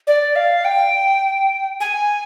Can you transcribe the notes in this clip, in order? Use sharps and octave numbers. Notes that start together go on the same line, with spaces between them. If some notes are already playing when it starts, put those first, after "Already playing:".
D5
F5
G5
G#5